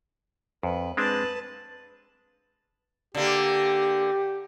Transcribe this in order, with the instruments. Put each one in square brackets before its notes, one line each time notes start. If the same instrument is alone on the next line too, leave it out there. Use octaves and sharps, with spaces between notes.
[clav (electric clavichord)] F2 [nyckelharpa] B4
[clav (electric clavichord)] G#3 C4 D4 [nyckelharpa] B4 A5
[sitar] D3 A#3 [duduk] G4